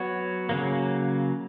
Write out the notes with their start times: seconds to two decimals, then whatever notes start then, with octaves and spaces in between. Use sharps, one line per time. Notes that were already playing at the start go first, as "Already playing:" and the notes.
Already playing: F#3 B3 F#4 C#5
0.49 C#3 F#3 A#3